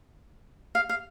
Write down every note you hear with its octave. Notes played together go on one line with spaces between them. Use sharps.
F5
F5